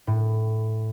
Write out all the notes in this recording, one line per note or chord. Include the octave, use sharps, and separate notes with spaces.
A2